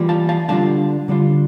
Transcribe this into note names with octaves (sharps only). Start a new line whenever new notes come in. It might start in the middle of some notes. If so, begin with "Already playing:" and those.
Already playing: E3 G3 A#3 F4
F5 A5
F5 A5
D3 G3 D4 F4 F5 A5
D3 G3 D4 F4